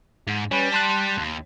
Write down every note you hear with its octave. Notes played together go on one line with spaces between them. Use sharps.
G#2
G3 C#4 B4
A5 C6 F#6
D#2